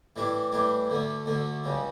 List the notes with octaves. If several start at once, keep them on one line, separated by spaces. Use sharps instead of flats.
A2 E3 G3 D4
A2 E3 G3 D4
D2 D3 A3
D2 D3 A3
C#2 C#3 G3